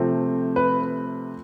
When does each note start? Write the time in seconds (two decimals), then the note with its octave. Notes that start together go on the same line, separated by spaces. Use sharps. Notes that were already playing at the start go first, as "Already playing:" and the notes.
Already playing: C3 F3 A3 C4
0.56 B4